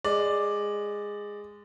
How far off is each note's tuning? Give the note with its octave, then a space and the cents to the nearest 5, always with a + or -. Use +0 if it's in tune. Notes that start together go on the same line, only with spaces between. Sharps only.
G#3 -10 D5 +5